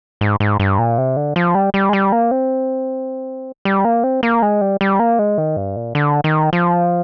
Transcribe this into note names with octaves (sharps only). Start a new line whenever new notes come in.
G#2
G#2
G2
A#2
C3
D3
F3
G3
G3
G#3
G3
A#3
C4
G3
A#3
C4
A#3
G#3
G3
G3
A#3
G#3
D#3
G2
A#2
D3
D#3
F3